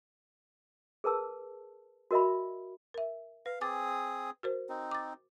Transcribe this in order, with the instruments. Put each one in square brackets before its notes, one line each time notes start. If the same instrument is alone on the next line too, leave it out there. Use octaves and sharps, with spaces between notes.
[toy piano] G#4 A#4 B4 A5 E6
F#4 A#4 D#5 E5 B5
[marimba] A#4 E5
[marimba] B4 [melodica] F5
[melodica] C4 G#4 D#6 [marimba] G#5 D6 A6
[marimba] F#4 A#4 C5
[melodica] C4 D#4
[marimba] D6 A6